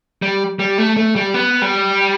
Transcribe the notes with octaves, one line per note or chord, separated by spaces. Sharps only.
G3
G3
A3
A3
G3
B3
G3